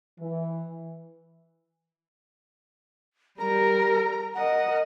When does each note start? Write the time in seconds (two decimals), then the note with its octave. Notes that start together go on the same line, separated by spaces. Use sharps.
0.20 E3
3.40 G3 A#4 A#5
4.35 A#4 D#5 F#5